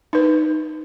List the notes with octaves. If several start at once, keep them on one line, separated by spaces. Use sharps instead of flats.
D#4 B4